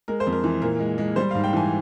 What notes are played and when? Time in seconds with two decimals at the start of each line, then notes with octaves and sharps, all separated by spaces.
0.08 G#3 A#4
0.20 C5
0.27 F2
0.32 A#4
0.44 E3
0.62 A#2 A#4
0.80 G#3
0.98 G#3
1.16 G3 C5
1.31 G#2 F5
1.44 G5
1.53 E3 G#5